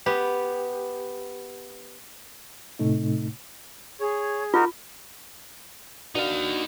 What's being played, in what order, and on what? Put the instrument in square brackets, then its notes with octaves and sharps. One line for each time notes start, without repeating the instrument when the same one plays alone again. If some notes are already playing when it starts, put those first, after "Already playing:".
[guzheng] B3 G4
[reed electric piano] A2 C3 A3 D#4
[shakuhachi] G#4 [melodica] C#5
[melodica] D#4 F#4 A#4 [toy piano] F4
[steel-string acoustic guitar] D4 F#4 A#4 [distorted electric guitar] D#4 F5